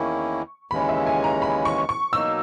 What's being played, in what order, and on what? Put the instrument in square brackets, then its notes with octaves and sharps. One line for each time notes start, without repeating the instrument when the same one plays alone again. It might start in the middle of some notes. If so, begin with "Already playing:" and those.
Already playing: [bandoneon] E2 D#3 A#3 C#4 E4 [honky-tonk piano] C#6
[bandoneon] D#2 C#3 E3 G#3 C#4 [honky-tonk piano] B5
[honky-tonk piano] E5
G#5
A#5
B5
C#6
C#6
[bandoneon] B2 F#3 A#3 D#4 [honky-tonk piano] E6